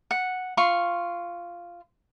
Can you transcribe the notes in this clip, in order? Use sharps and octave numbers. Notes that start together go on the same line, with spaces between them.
F#5
F4 C6 C#6